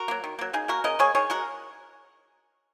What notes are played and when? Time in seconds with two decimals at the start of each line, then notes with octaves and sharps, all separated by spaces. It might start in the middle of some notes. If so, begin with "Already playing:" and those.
Already playing: F#4 A#4
0.08 F#3 A#3
0.24 D#3
0.39 F#3 A#3
0.53 C#3 D#4 G#4
0.68 A#3 F#4 A#4
0.84 C#3 A#4 D#5
0.99 A#3 G#4 C#5
1.15 D#3 G#4 C#5
1.30 G#3 F#4 A#4